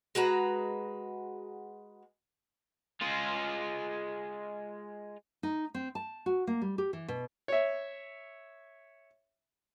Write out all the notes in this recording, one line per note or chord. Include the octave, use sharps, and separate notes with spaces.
G#3 F#4 B4 A#5
G#3 F4
D#4
C4
A5
F#4
A#3
G3
G4
E3
B2
C#5 E5